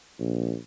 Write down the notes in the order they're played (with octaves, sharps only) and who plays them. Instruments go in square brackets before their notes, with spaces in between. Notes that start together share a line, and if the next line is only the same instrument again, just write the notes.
[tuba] A#1